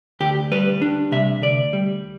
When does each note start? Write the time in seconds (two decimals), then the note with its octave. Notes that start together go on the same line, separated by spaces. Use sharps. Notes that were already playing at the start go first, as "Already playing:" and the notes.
0.20 D2 G4
0.52 G3 B4
0.82 D4
1.12 C3 E5
1.42 D2 D5
1.73 G3